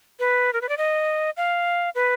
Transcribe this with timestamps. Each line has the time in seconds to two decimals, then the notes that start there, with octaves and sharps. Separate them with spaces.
0.20 B4
0.53 A#4
0.61 B4
0.69 D5
0.78 D#5
1.37 F5
1.95 B4